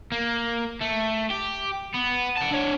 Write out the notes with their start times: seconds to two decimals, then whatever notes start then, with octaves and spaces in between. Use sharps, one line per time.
0.12 A#3
0.81 A3
1.30 G4
1.94 B3
2.38 F#5 A5
2.52 D4 C#5